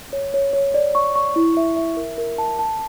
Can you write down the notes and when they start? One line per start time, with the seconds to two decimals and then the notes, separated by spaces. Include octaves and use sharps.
0.13 C#5
0.34 C#5
0.53 C#5
0.74 D5
0.95 C#6
1.15 C#6
1.36 E4
1.57 E5
1.76 E5
1.97 A#4
2.18 A#4
2.38 A5
2.59 A5